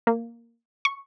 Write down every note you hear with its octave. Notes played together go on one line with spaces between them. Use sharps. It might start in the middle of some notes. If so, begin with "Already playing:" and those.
A#3
C#6